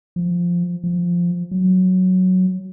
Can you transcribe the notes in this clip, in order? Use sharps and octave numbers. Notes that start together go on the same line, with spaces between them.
F3
F3
F#3